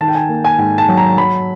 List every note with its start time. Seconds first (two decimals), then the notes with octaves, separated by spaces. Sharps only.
0.01 D#3 A5
0.08 G5
0.15 G#5
0.29 A#3
0.45 G#5
0.58 G#2 G#5
0.78 A5
0.89 F#3
0.97 A#5
1.18 F#3 B5